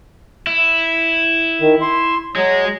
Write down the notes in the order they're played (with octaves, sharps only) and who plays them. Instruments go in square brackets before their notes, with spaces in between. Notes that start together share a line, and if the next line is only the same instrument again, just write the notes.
[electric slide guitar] E4
[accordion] D#3
C6
[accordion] F#3 [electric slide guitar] G#3